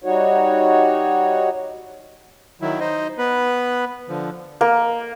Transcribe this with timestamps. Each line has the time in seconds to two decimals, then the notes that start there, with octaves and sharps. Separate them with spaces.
0.04 G3 D#4 F#4 C#5
2.61 D#3 F#3 E4
2.80 D#4 C5 D#5
3.18 B3 B4
4.09 D3 F3
4.61 A#3